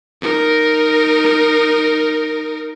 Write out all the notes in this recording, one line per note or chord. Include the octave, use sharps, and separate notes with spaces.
D#4 A#4